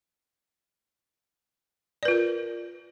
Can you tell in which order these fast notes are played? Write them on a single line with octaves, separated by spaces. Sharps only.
D5 B4 F4 A#4